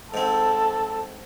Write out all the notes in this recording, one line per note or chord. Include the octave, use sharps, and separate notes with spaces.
G#2 C4 A4